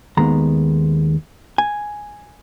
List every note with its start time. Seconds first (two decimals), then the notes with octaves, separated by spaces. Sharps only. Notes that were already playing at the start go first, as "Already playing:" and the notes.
0.17 D#2 D#3 G#3 B3 A#5
1.58 G#5